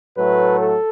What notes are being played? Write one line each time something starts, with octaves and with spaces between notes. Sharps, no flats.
A2 F#3 A3 B4
A4